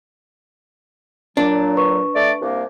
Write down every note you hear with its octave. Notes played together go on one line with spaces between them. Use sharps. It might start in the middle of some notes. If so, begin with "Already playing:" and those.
A#2 F#3 D4
B4 C#6
A3 D5
C2 A#3